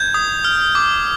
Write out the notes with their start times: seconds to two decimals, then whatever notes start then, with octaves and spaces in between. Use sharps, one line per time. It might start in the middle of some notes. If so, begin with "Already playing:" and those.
Already playing: G6 G#6
0.14 D#6
0.44 F6
0.75 D6